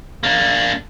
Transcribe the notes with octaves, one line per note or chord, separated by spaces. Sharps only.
A#3 D4